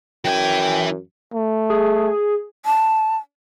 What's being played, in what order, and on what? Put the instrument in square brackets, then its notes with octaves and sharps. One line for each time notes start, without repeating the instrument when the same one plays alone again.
[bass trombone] F#2 [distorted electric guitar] E3 G#5 [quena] G5
[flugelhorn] A3
[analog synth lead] G#4
[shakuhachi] A5